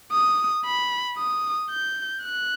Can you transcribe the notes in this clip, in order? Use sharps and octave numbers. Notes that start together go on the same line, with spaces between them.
D#6
B5
D#6
G6
F#6